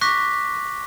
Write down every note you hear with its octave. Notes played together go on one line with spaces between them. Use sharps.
C#6 D6 F#6 A#6 B6